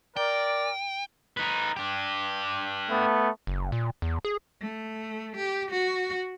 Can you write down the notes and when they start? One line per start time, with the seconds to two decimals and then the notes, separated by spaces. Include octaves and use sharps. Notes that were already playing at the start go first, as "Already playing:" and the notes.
0.16 A#4 D5 G5
1.37 D#4 B4
1.76 D4 G4
2.88 A3 B3
3.47 F#1
3.72 A#2
4.02 E2
4.25 G#4
4.61 A3
5.36 G4
5.71 F#4